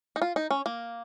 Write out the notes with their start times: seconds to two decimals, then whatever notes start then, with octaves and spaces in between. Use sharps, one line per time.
0.16 D#4
0.22 F4
0.36 D#4
0.51 C#4
0.66 A#3